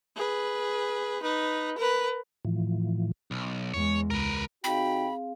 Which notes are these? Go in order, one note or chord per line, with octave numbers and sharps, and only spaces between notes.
G#4 B4
D#4 B4
A#4 B4
A2 E3 F3
B1
E2 G#3 C#5
C#2 A#4 B4
C3 C4 D#4 F#4 G#4 F5 G5 B5